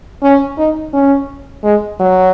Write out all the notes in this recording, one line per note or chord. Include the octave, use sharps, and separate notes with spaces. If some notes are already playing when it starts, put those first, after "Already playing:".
C#4
D#4
C#4
G#3
F#3